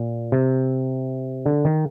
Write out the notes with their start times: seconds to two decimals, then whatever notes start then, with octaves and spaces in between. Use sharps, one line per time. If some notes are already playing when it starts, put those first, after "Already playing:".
Already playing: A#2
0.32 C3
1.46 D3
1.65 D#3